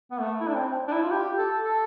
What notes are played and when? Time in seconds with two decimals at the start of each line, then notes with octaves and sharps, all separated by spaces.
0.12 B3
0.20 A3
0.41 E4
0.48 D4
0.56 C4
0.88 D4
0.93 E4
1.02 F4
1.11 G4
1.38 A4
1.62 A4